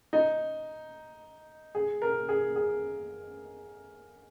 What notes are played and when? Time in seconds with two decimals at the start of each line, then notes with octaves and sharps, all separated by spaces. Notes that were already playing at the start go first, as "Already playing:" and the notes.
0.13 D#4
1.75 G#4
2.02 A#4
2.29 G#4
2.56 G#4